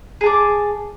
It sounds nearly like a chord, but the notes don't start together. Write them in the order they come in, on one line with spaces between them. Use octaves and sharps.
G#4 A5 D6